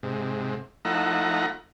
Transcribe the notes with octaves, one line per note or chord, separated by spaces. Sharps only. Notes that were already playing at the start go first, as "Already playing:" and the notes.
G#2 C3
F3 A3 D#4 E4 F#5 A#5